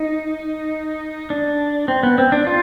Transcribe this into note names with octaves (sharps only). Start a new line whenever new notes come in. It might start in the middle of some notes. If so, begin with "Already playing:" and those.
Already playing: D#4
D4
C4
B3
C4
D4
F4